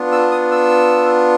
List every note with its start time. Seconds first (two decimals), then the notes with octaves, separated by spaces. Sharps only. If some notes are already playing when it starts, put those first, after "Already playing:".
Already playing: B3 D4 F4
0.12 E6
0.31 D#6
0.51 E6